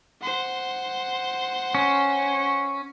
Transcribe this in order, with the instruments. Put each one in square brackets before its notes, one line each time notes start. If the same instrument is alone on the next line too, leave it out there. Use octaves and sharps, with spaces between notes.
[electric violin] C5 F#5
[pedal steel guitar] C#4